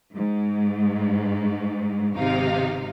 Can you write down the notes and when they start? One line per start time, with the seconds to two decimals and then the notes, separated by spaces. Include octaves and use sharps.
0.14 G#2
2.17 G#1 C3 D#4 F5